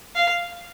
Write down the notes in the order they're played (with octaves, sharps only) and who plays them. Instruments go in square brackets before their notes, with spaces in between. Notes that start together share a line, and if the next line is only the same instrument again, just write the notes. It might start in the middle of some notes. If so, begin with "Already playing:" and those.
[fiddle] F5